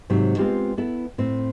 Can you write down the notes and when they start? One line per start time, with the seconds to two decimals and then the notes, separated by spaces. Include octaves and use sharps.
0.10 G#2 C3 F#3 A3
0.38 G#3 A3 B3 C4 F4 G4
0.78 B3 E4 A4
1.18 A2 C4